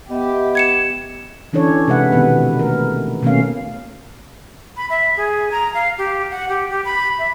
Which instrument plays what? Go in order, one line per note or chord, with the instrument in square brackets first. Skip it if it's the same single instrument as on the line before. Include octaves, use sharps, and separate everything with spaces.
[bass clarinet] B3 [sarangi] G4 [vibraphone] D#5 E5
[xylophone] G#6 C#7 E7
[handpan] E3 C#4 D4 A4 C#5
C3 G#3 B4 E5 F#5
B2 D#3 B3 B4
A3 A#4
B2 D#3 A3 A#3 C#4 F5
[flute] B5
E5
G#4
A#5
F5
G4
F#5
G4
G4
B5
E5